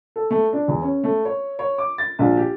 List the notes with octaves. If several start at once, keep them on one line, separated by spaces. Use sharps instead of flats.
A4
A3
D4
E2
C#4
A3
C#5
C#5
D6
A6
A#1
G4